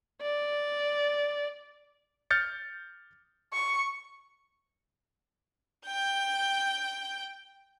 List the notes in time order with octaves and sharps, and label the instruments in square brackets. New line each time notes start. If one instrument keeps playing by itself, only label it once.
[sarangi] D5
[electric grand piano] F6 G6 A6 C#7
[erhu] C#6
[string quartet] G5 G6